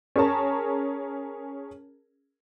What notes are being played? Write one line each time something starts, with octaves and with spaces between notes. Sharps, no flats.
C#4 G#4 A#4 C#5 A5 A#5